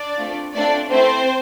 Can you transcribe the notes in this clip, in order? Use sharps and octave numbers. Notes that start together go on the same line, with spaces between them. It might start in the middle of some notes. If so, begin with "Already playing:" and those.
Already playing: D4 D5
A3 C4 F4
A3 C4 D4 F4 A4 D5
A3 C4 E4 A4 C5